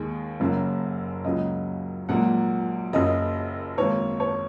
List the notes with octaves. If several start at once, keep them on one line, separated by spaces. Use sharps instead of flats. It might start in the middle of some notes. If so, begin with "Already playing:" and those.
Already playing: D#2 D#3 G#3 G#4
F#1 F#2 C#3 F#3 A#3
C#2 C#3 F#3 A#3 D#5
A#1 G#2 F#3 A#3 F#5
F#1 F#2 C#3 D#5
G#1 G#2 D#3 A#3 C#5
C#5